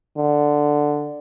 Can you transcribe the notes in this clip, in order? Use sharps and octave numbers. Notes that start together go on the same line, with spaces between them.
D3